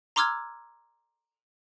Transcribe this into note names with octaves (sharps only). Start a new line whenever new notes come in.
A#5 C6 D6 E6 F6 G#6